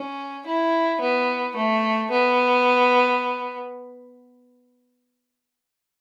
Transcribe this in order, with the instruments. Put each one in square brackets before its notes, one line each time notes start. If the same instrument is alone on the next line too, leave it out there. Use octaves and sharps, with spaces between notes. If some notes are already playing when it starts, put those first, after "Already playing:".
Already playing: [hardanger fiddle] C#4
E4
B3
A3
B3